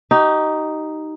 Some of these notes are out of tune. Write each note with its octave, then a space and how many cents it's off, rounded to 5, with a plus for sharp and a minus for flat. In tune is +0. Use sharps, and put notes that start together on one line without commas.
D#4 +0 G4 -35